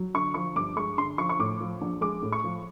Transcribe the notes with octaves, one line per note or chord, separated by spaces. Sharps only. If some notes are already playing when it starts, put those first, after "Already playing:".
Already playing: F#3
D3 C#6
F3 C#6
G2 D6
G#3 C#6
D3 C6
F3 C#6
C#6
A2 D6
F3
A#1
G#3 D6
A2
C#6
F3